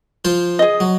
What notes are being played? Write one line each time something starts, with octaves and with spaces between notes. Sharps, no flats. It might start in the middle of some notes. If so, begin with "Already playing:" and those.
F3 F4 C5
G#4 D#5
F#3